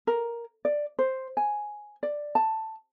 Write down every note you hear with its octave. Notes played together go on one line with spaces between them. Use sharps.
A#4
D5
C5
G#5
D5
A5